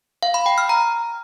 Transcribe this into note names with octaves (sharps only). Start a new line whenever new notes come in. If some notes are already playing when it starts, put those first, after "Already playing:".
F5
B5
G5
F6
A#5